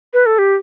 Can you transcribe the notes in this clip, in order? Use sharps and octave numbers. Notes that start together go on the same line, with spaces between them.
B4
A4
G4